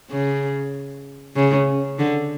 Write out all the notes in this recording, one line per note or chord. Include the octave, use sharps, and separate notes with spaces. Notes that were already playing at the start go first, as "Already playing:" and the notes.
C#3
C#3
D3